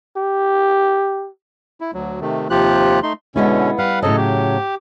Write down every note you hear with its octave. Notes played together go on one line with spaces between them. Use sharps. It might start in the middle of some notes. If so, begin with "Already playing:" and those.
G4
E4
D2 F#3
C3 D#3 A3
D#2 C3 F3 F4 G4 F#6
A3 D#4 C6
B2 D3 G#3 B3 C#4 E4
G3 B4 F5 F#5
A2 C#3 F#3 A4 D#5
G4